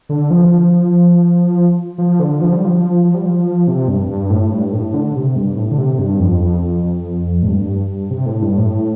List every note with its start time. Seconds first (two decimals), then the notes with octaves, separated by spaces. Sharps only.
0.09 D3
0.30 F3
0.51 F3
1.98 F3
2.20 D3
2.41 F3
2.53 G3
2.65 F3
3.05 F3
3.14 G3
3.25 F3
3.67 C3
3.88 G2
4.09 G2
4.30 A2
4.52 G2
4.73 A2
4.94 D3
5.15 C3
5.36 G2
5.57 A2
5.71 D3
5.78 C3
5.99 G2
6.20 F2
6.42 F2
6.62 F2
6.83 F2
7.42 A2
7.47 G2
8.10 C3
8.26 A2
8.42 G2
8.57 A2